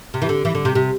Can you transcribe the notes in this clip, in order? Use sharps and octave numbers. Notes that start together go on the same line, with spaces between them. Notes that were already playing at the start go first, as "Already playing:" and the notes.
C3
E3
D3
E3
D3
C3
C3